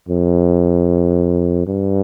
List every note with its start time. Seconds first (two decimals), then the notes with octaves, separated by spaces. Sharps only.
0.09 F2
1.67 G2